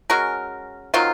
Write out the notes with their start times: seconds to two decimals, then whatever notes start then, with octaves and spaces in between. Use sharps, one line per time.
0.10 G#3 C#4 F#4 A#4
0.94 D#3 F#3 C4 F4